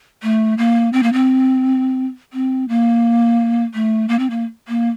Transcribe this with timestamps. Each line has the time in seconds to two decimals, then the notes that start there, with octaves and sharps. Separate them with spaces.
0.23 A3
0.58 A#3
0.93 C4
1.03 A#3
1.13 C4
2.33 C4
2.69 A#3
3.74 A3
4.08 A#3
4.19 C4
4.30 A#3
4.68 A#3